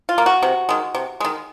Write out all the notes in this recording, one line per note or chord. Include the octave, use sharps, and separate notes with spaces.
F4
A#3
F#4
C3
D#3 G#3
C3
D#3 G#3